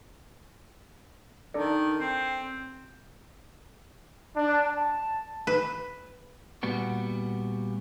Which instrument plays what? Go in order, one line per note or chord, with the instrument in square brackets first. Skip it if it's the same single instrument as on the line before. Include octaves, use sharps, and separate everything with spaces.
[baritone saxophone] D#3 [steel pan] D4 A4 D5
[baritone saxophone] C4
[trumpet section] D4
A5
[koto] B4
[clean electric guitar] A#2 G3 B3 F#4